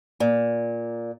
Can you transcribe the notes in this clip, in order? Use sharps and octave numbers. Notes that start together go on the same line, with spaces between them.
A#2